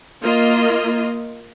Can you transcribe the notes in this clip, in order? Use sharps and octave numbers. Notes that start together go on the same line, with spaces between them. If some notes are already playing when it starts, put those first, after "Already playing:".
A#3 F4 D#5